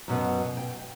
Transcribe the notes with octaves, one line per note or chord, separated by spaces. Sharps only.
F#2 B2 B3
G5